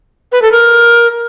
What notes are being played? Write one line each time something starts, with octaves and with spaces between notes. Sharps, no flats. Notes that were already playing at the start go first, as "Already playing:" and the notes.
B4
A4
A#4